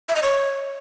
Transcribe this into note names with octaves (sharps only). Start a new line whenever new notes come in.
E5
D#5
C#5